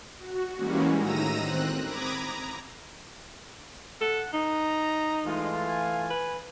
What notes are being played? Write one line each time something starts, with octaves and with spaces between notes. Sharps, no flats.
F#4
E3 G3 G#3 A#3 C#4 F#4
A2 D#3 A#5 E6 A#6 D#7
C4 F#6
A#5 B5 D6 D#6 G#6 A#6
A#5
A4 F#5
D#4 A#5
E3 G#3 A3 F4
G#5
B4